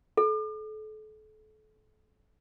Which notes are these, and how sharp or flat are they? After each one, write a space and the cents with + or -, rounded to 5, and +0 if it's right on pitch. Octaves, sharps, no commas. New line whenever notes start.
A4 -35